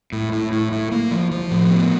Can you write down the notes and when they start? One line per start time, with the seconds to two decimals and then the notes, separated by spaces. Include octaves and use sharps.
0.12 A2
0.32 A2
0.52 A2
0.72 A2
0.92 A#3
1.11 F3
1.31 F3
1.51 A2
1.70 B3